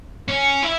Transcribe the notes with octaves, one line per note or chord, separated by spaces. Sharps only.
C#4
E4